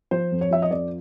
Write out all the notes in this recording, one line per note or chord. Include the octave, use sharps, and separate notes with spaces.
F3 C5
F2
C#5
F3 E5
D#5
F2 D5